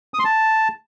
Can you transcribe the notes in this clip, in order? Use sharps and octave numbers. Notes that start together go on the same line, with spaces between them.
D#6
C6
A5